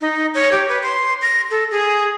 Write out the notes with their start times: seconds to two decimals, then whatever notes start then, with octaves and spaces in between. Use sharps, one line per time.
0.01 D#4
0.35 C#5
0.52 G4
0.69 B4
0.83 C6
1.22 A#6
1.51 A4
1.71 G#4